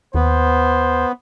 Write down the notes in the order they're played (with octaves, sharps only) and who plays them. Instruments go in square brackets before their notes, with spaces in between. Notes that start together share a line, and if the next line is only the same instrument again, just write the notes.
[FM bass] D#2 [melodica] B3 [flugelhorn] C5